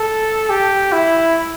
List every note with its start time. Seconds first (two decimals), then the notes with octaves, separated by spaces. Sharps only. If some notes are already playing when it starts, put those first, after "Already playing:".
Already playing: A4
0.50 G4
0.93 E4